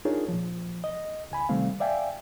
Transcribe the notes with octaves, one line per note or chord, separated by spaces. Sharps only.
D4 D#4 F4 G#4 A#4 C#5
A#2 F3
D#5
C#2 G#5 B5
C3 D#3 G3 A3 C4 F5
D5 E5 F5 G5 G#5